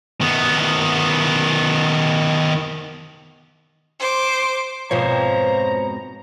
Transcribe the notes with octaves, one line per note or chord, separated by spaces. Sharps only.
D#3 B3
C5 D6
F2 G#2 B2 F3 C5 C#5 A#5